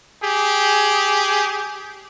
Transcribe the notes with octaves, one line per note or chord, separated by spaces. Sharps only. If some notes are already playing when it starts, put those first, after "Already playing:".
G4 G#4